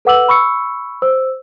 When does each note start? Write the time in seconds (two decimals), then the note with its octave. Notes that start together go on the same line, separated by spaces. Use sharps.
0.05 A4 B4 F#5 D6 E6 F#7
0.28 B5 C#6 E6 C#7
1.02 C5 E6